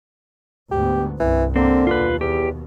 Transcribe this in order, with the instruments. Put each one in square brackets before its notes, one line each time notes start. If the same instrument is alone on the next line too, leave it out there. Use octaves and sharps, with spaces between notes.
[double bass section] D2 G#2 B3 [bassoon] G4
[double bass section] C2 G2 [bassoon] E3
[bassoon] D3 [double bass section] A#3 [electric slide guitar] C4
[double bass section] D#2 B2 [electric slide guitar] F4 B4
[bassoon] E2 [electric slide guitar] G4